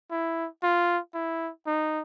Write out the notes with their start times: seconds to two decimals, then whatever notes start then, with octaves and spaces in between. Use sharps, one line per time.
0.11 E4
0.63 F4
1.14 E4
1.67 D#4